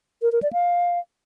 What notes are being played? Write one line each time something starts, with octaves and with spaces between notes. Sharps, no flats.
A#4
A#4
D5
F5